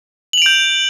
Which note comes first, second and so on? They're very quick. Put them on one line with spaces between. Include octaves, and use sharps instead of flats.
F#7 F7 D7 G6